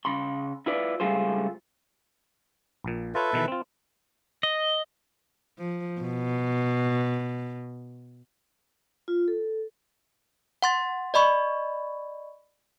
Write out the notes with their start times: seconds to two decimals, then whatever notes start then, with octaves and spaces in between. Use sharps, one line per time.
0.05 C#3 B5 C6
0.66 E4 F4 B4 D5
1.00 C#2 G3 A3 F4 G#4 C5
2.84 A#1 A#2
3.15 F4 A4 B4 C#5 E5
3.33 B2 D#3 E3
3.48 C4 F4
4.43 D#5
5.58 F3
6.01 B2
9.08 F4
9.28 A4
10.62 F#5 C6 A6
11.14 D5 D#5 B5 C#6